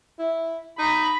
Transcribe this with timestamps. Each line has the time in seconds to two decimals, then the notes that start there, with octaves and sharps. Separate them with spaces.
0.19 E4
0.79 D#4 B5